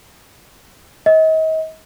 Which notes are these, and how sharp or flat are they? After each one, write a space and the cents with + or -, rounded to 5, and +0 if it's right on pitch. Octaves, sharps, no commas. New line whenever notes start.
D#5 +35